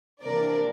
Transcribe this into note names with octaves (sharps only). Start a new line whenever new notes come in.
C3 E3 A#3 D4 A#4 D5